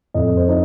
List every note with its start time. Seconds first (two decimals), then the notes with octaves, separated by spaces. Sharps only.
0.14 F2 D#5
0.37 C5
0.48 D#4 D#5